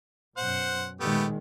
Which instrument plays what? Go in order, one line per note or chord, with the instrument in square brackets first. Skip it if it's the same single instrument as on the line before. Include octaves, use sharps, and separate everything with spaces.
[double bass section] F#2 B2 [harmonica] C5 F#5
[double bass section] A#2 D#3 G#3 [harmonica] A3 B3 G4